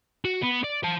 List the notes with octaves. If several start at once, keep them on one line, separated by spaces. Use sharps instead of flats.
F#4
B3
D5
C5 A5